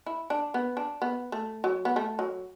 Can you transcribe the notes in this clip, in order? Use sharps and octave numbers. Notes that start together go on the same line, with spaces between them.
E4
D4
B3
D4
B3
A3
F#3
B3
A3
F#3